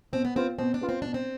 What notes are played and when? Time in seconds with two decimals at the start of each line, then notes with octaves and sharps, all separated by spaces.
0.13 B2 C4
0.25 B3
0.35 B3 C4 F4
0.59 B2 C4
0.74 D4
0.81 B3 F4
0.89 C4
1.02 B2 D4
1.14 C4